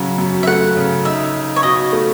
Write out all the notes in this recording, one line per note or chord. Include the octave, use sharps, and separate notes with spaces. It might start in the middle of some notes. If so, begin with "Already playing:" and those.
Already playing: C#3 F#3
F#2
E5
A3 F#5
C#3
D#4 E5
D#4
C#5
B2 D#5
A3